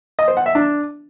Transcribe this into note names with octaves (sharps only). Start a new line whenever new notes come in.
D#5
C5
F#5
E5
D4